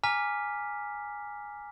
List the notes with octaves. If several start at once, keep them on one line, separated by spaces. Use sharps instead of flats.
G#5 A#5 D6 F6 B6